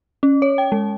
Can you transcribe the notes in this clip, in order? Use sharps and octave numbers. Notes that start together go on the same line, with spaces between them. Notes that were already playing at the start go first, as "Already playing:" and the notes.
C#4
C#5
G5
G#3